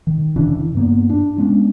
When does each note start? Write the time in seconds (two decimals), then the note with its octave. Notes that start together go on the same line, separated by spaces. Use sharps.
0.07 D#3
0.36 F1 C#3 E3 D4
0.75 G2 A#3 B3
1.10 D4
1.38 G#3 B3 C#4 D4